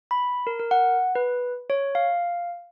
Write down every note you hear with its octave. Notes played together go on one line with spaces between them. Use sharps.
B5
A#4
A#4
F#5
B4
C#5
F5